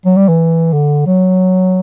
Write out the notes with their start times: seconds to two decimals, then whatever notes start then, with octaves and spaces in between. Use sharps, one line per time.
0.06 F#3
0.17 G3
0.28 E3
0.73 D3
1.06 F#3